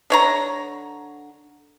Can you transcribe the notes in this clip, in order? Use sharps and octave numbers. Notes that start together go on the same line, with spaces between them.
D3 C#5 A#5